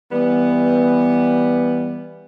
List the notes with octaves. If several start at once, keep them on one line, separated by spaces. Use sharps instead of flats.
E3 G3 B3